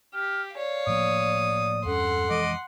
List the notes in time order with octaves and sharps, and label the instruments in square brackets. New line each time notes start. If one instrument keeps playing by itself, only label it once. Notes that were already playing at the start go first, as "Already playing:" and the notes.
[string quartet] G4 [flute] F6
[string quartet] C#5 F5 [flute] D5
[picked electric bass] A2 F3 A#3 [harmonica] D#6
[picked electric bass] E2 G2 C#4 [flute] A4 [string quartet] F#5 C6
[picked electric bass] F2 E3 G#3 [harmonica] D#5 D6